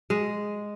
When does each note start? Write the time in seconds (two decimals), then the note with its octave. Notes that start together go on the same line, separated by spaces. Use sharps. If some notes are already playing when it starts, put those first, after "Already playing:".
0.10 G#3